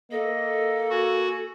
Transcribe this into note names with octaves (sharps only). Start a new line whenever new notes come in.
A#3 A4 D#5
F#4 G#5